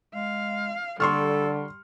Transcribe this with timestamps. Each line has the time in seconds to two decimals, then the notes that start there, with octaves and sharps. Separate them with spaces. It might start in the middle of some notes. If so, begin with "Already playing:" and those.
0.15 G#3 F5
1.00 D3 G3 A4 C6 C#6 F6